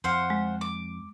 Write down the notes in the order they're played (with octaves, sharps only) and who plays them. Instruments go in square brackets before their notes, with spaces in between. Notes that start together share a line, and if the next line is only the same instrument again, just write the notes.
[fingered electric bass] F2 [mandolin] C5 F5 F#5
[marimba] G#3
[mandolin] D6